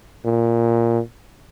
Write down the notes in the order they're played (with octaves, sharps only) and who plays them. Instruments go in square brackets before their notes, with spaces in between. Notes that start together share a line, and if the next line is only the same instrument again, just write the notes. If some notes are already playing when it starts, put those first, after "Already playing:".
[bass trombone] A#2